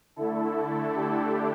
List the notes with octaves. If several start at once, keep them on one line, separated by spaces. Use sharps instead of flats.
D3 A3 E4 A4
D4 G4